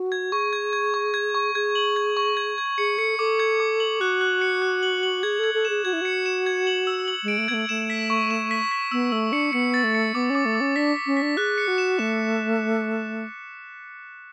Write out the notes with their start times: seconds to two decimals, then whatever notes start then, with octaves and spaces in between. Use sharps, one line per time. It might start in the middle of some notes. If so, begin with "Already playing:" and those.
Already playing: F#4
0.12 G#6
0.32 G#4 C#6
0.53 G#6
0.73 G#6
0.94 C#6
1.14 G#6
1.34 C#6
1.55 G#4 G#6
1.75 F#7
1.96 G#6
2.17 C#6
2.37 G#6
2.58 G#6
2.78 G#4 C#7
2.98 A4 C#7
3.19 A4 D6
3.39 G#6
3.60 D6
3.80 F#7
4.00 F#4 F#6
4.21 F#6
4.41 C#7
4.62 F#6
4.83 F#7
5.03 F#7
5.23 G#4 G#6
5.39 A4 G#6
5.54 A4
5.65 G#4 E7
5.85 F#4 G#6
5.93 E4
6.01 F#4 C#7
6.26 E7
6.46 G#6
6.67 F#7
6.87 E6
7.08 F#7
7.23 G#3
7.28 D7
7.38 A3
7.48 B3 G#6
7.54 A3
7.69 A3 E7
7.90 B6
8.10 C#6
8.31 E7
8.51 B6
8.71 B6
8.91 B3 E6
9.12 A3 E6
9.32 D4 C#7
9.53 B3 C#7
9.74 A6
9.84 A3
9.95 C#7
10.15 B3 D6
10.30 C#4
10.35 D6
10.45 A3
10.55 D6
10.61 C#4
10.76 D4 B6
10.96 B6
11.06 C#4
11.17 B6
11.22 D4
11.37 G#4 F#6
11.58 C#7
11.68 F#4
11.78 E7
11.99 A3 E7